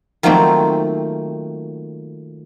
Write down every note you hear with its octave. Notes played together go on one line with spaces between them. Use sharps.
D#3 F3 F#3 A3 A#3 C4